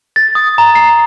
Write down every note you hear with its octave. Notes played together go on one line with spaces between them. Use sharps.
A6
D#6
A#5
C7